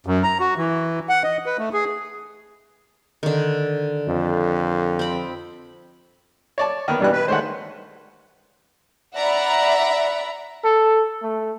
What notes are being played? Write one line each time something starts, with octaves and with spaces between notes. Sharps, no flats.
F#2
A#5
F#4
E3
F#5
D#5
B4
A3
G#4
D3 D#3
F2
C4 B5
C#5 D5 A5
D#3 B3
G2 B2 E3 G3 F#6
B4
D#3 G#3 A3 C5 C#5 F#5
D5 E5 F#5 A#5 B5
A4
A3